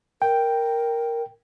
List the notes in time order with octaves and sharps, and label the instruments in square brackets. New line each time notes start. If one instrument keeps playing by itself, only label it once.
[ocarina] A#4 [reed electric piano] G5